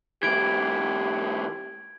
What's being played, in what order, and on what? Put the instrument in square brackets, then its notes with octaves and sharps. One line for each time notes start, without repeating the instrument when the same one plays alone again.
[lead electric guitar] G#2 E3 [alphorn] G4 [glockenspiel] G#6 D7